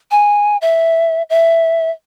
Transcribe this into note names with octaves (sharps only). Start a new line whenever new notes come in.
G#5
E5
E5